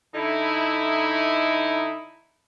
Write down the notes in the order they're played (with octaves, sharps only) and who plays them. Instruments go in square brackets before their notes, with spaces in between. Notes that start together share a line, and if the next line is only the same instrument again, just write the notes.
[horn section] D3 D#4 E4